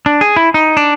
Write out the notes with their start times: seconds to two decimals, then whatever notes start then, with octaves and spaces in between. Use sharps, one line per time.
0.06 D4
0.21 G#4
0.36 E4
0.54 D#4
0.77 D4